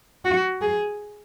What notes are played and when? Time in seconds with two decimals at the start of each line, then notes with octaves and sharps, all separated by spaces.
0.25 F#4
0.61 G#4